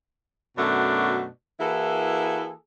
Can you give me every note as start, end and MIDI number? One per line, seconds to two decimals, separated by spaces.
0.58 1.27 42
0.58 1.27 47
0.58 1.27 57
0.58 1.27 62
0.58 1.27 66
1.60 2.52 52
1.60 2.52 58
1.60 2.52 64
1.60 2.52 66
1.60 2.52 68
1.60 2.52 69